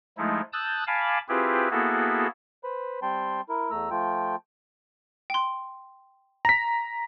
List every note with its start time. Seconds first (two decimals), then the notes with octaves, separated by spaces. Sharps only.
0.18 F3 G#3 A3 D#4 E4
0.53 A5 D#6 E6 F#6 G6 A6
0.87 F5 G#5 A5 B5 D6
1.29 C4 E4 F4 G4 G#4 B4
1.71 A#3 B3 E4 F#4 G#4 A4
2.64 B4 C5 B5
3.02 G3 C4 G5 A5 C6
3.49 E4 A#4
3.71 E2 A3 A#5 E6
3.90 F3 A3 F4 G5
5.30 G5 C6
6.45 A#5 A#6 B6